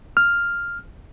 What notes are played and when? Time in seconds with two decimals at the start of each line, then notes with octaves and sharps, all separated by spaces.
0.17 F6